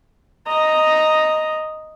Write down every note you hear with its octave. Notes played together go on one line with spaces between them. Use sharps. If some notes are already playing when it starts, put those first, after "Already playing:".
D#5 A#5